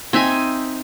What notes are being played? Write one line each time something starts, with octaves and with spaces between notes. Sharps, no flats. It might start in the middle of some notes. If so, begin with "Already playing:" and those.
C4 D#4 E5 G#5